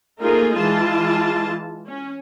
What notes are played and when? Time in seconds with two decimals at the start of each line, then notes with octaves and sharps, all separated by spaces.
0.21 A3 A#3 D#4 F4 G#4 A#4
0.57 E3 G#3 F4 A5
1.87 C#4